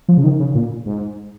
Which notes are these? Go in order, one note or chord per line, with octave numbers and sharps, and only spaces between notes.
F3
C#3
D#3
C#3
A#2
G#2